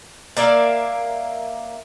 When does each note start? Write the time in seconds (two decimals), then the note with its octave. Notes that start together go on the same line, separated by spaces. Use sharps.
0.37 A#3 D5 E5 F5